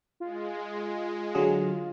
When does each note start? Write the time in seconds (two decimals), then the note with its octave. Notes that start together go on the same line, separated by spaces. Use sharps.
0.20 G#3 F4
1.35 D3 F#3 G#4